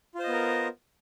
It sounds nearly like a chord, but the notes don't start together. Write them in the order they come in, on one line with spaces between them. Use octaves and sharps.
F4 C5 D#5 B3 A#4